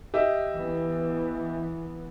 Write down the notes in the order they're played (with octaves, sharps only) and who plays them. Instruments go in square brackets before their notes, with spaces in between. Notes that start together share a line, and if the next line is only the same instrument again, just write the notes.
[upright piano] G4 D#5 E5
[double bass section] E3 B3